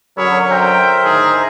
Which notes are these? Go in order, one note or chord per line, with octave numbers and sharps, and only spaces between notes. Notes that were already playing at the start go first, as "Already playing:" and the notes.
F#2 D3 F#3 G#4 A#4 C#5 B5 E6
C5 E5 G5 A#5
D2 A2 D#3 G#4